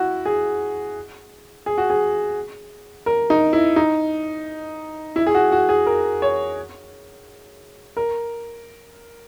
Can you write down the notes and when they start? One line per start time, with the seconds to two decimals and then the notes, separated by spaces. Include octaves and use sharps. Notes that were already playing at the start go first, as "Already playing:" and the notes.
Already playing: E4 F#4
0.26 G#4
1.66 G#4
1.78 F#4
1.90 G#4
3.06 A#4
3.30 D#4
3.53 E4
3.76 D#4
5.16 E4
5.27 G#4
5.35 F#4
5.52 F#4
5.69 G#4
5.86 A#4
6.22 C#5
7.97 A#4